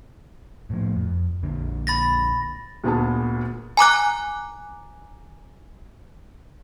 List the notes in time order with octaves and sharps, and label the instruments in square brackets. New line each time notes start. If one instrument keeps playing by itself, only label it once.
[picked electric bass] A2 F3
F2
A#1 A#2 D3
[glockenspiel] B5 A6 A#6
[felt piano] D2 A#2 B3 G#4 A5
[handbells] G#5 A#5 D6 F#6